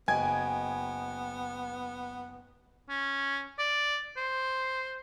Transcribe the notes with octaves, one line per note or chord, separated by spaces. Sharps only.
F#1 B3 D#5 G5 G#5 G#6
C#4
D5
C5